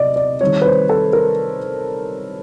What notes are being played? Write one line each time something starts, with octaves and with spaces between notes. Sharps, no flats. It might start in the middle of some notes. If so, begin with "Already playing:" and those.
Already playing: C3 D5 D#5
D5
D#3 G3 C4 C#5
B4
C5
A4
A#4